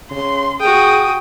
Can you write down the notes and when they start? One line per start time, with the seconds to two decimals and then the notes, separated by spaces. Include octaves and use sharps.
0.11 C#3 C6
0.60 F#4 G#4 G5 D#6